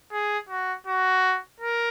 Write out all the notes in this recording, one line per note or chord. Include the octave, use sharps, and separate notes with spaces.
G#4
F#4
F#4
A#4